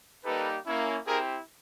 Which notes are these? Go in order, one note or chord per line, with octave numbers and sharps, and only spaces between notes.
G3 A#3 D#4 G4 A4 B4
A#3 C#4 E4
C4 E4 G4 G#4 A#4